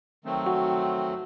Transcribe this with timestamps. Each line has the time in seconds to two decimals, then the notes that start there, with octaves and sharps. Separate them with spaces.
0.24 D#3 F#3 A3 C4
0.47 F#4